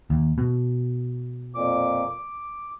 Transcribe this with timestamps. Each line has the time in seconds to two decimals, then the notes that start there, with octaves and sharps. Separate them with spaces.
0.10 D#2
0.38 B2
1.55 F2 A#2 D6
2.09 D6